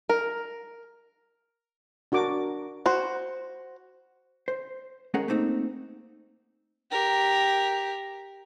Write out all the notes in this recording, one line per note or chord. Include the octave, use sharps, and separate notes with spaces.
A#4
D4 F#4 A#4 D6
F#4 C5
C5
G#3 C#4 G#4 A#4 C#5 F#5
A3 A#3 C4 D#4
G4 A#4